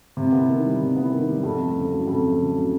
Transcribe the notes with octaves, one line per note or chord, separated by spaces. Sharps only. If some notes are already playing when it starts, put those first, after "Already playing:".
C3
B3
D#3
G3
C3
B3
D#3
G3
F2
A3
C#3
F#3
F2
A3
C#3
F#3